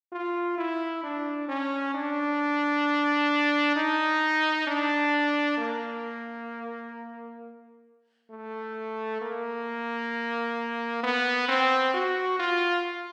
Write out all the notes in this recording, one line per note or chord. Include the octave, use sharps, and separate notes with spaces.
F4
E4
D4
C#4
D4
D#4
D4
A#3
A3
A#3
B3
C4
F#4
F4